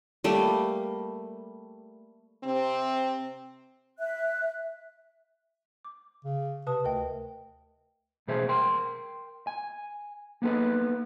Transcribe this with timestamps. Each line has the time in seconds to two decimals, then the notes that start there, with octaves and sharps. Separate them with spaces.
0.24 G3 A3 A#3
2.44 C3 C4
3.99 E5 F#6
5.85 D6
6.25 C#3
6.67 C3 B4 A5 D#6
6.84 D2 A#4 D#5 G5
8.28 E2 B2 A3 G#4 C5 E5
8.48 A#4 G5 C6
9.47 G#5
10.42 A#3 B3 D#4 A4 B4